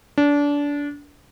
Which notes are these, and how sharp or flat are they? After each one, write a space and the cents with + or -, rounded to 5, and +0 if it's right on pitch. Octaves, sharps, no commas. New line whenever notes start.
D4 -25